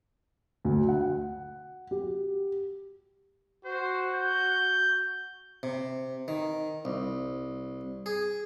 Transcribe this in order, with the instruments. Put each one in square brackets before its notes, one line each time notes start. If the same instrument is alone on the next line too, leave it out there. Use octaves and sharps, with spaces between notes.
[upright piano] D2
F#5
G4
[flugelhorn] F#4 [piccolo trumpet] C5
[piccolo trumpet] G6
[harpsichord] C3
D#3
C2
G#4